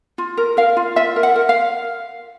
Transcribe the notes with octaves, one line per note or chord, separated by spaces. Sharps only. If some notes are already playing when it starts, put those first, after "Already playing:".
F4
A#4
A#4 F5
F4
F4 E5
A#4
F#5
A#4
F5